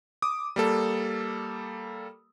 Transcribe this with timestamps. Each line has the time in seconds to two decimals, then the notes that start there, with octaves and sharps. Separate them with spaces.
0.22 D6 D#6
0.56 G3 A#3 A4